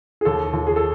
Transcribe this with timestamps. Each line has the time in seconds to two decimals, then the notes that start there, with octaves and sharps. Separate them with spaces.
0.21 G#4
0.25 D#2 A4
0.53 D#2
0.67 G#4
0.76 A4